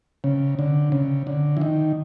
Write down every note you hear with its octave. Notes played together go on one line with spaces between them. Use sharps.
C#3
D3
C#3
D3
E3
D#3